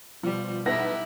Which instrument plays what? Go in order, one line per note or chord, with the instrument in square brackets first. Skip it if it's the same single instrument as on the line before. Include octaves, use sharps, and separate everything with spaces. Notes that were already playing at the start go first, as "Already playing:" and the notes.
[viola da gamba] B2 G3 [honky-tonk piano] F3
[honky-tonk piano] B1 B3 A#6 [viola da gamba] E4 G4